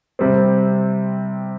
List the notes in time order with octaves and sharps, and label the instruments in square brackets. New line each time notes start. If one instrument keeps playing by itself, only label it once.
[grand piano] C3 G3 C4